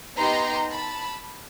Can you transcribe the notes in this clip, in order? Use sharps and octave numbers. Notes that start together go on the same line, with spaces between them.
B3 D#4 G4 A#5 C6
A5 B5